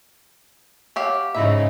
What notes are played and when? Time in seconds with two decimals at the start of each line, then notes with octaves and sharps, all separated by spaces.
0.96 F#3 G4 F5
1.34 G#2 C#3 F3 D#4 E4 E5